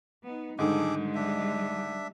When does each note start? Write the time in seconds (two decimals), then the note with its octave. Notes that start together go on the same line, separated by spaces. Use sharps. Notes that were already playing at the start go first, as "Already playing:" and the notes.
0.23 B3 D#4
0.59 G#2 D3 D#3 G3 G#3 G#4 A4 D6
1.15 D4 E5